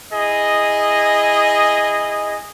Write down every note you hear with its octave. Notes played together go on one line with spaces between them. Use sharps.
E4 G#4 D#5